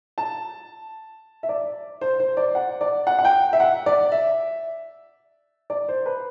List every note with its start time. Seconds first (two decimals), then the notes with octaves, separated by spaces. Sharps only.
0.18 A5
1.43 E5
1.49 D5
2.01 C5
2.20 C5
2.37 D5
2.55 F#5
2.81 D5
3.07 F#5
3.19 F#5
3.25 G5
3.53 E5
3.60 F#5
3.86 D5
4.12 E5
5.70 D5
5.89 C5
6.06 B4